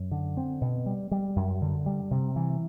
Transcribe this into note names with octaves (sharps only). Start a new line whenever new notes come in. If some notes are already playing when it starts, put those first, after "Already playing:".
Already playing: F#2
D3
C4
B2
G3
G3
F#2
D3
G3
C3
E3